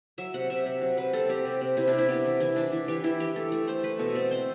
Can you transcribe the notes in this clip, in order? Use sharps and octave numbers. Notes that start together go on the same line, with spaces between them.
F#3 E5
C3 F#5
C3 E5
C3
F#3
C3 B4
C4 A4
C4 G4
C3
C3
C3 E4
D4
C3
E4
B3 G4
E3
E3 E4
E3 D4
E3
E3 G4
E3 E4
E3 G4
A3 A4
A3
A3 C5
A3 B4
B2 A4
C4 A4
C4 C5